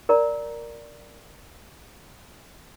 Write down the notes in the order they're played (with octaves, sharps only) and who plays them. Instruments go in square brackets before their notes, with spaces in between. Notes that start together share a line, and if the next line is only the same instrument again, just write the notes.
[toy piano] A#4 D5 A#5